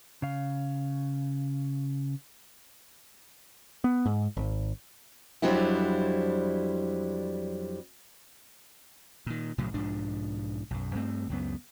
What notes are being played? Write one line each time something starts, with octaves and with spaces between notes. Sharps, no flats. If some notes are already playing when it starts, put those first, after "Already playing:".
C#3 F5
B3
G#2
G#1
F2 F#3 G3 C4 D4 E4
A#2 D#3
B1 A2 C#3 F#3
B1 G#2 F3 D4
B1 F#2
G2 A3 C4
C#2 F#2 B3